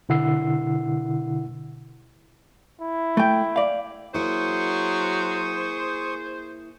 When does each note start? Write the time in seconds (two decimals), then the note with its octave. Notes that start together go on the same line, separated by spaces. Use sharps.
0.09 B2 D3 E4 F#5 E6 C7
2.82 E4
3.17 A3 G5
3.56 D5 F5
4.14 F#3 A#3 E4 G#4 C5 C#6 D#6